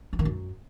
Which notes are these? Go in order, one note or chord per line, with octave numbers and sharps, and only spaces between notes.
E3
D#3
F#2